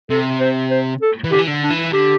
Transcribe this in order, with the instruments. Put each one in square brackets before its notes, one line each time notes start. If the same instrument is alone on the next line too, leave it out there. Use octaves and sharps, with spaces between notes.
[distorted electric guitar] C3 [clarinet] A4
[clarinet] C5
C5
A4
[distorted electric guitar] E3
[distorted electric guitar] D3 [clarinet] G4
[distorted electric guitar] E3
D3
[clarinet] D4
[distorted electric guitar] E3
[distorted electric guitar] D3 [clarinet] G4